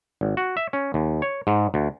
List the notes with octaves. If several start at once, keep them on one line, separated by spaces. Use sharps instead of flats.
G#1
F#4
E5
C#4
D#2
C#5
G#2
D2